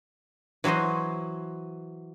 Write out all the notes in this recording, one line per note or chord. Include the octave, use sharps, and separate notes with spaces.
E3 F#3 F#4 C5 D#5